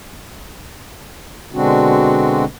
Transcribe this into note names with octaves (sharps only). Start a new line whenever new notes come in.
B2 D3 G#3 C4 D4 F#4